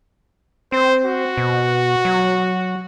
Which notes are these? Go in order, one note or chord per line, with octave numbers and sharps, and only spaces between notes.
C4 C5
F#4
B2
F#3